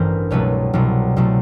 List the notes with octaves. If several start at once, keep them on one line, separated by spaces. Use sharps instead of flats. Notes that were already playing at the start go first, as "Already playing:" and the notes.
Already playing: A1 G2 E3 A#4 C5
C2 B2 F#3 A3 B4 C#5
C2 B2 F#3 A3
C2 B2 F#3 A3